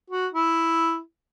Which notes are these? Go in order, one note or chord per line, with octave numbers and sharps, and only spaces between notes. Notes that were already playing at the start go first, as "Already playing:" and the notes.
F#4
E4